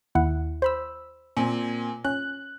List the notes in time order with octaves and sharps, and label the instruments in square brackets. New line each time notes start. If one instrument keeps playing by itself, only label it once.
[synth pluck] D#2 E4 F#5
C5 B5 E6
[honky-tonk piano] A#2 C4 G#5
[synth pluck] C#4 [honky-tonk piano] F#6